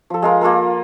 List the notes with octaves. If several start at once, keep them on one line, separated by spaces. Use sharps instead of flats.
F3 A4
G#3 F4 A#4
A#3 F4 A4 A#4